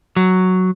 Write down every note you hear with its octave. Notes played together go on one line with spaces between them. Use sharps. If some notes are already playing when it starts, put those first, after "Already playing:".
F#3